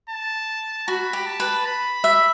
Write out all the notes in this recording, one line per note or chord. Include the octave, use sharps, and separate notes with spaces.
A5
F#4 B5
G4
A5
B4
B5
E5